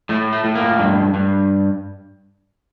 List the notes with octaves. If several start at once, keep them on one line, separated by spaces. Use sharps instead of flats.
A2 A3
A3
A2
A#3
G2
G2